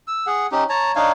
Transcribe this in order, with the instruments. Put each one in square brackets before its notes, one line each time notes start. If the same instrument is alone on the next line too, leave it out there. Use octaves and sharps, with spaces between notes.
[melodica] E6
G#4 F#5
C#4 D#4 G4
C#5 A5 A#5
D4 D#4 C#5 F5